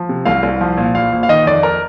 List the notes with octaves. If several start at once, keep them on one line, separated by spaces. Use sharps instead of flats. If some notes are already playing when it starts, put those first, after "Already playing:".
Already playing: F3
C3
C2 F5
C2
F3
A#2
A#1 F5
A#1
F5
D#3 D#5
F2 D5
A#4